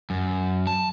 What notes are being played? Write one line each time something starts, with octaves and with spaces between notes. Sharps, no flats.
F#2
A5